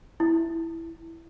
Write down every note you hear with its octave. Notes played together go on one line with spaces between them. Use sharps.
E4